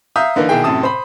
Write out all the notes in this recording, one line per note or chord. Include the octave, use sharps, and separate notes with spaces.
E5 F5 A#5 D#6 G6
D3 E3 A#3 D#4
B1 D#3 E4 G#4 G5
F#2 A2 C3 A5 D#6
C5 B5